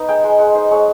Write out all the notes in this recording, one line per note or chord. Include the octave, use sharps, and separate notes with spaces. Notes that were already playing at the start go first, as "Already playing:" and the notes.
Already playing: B3 D#4
G#3 G5
G#3
G#3 F#5
D#4 C5
G#3 C#5